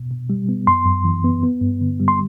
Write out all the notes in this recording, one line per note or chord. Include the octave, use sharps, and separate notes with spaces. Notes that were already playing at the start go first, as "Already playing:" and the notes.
Already playing: B2
B2
G3
B3
F#2 C6
F#2
E3
B3
B3
G2
D3
G3
C6